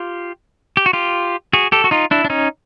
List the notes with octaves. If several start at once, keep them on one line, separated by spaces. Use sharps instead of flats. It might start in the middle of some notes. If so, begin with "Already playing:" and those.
Already playing: F4 G4
G4
F#4
F4 G4
F#4 G#4
G4 A4
F#4
D#4 F4
D4 E4
D4
C#4 D#4